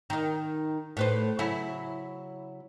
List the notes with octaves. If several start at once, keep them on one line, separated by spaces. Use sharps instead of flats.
D#3 D#4
A2 B4 C5
C#3 F#3 E4